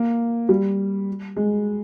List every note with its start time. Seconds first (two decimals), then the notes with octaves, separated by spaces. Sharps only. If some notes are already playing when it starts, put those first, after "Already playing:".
Already playing: A#3
0.49 G3
1.37 G#3